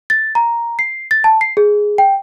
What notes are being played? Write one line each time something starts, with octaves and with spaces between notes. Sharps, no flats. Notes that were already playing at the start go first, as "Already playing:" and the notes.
A6
A#5
C7
A6
A5
C7
G#4
G5